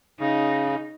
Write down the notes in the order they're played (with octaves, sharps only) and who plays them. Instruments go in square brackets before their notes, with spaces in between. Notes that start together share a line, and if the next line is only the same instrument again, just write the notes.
[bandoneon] C#3 [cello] D#4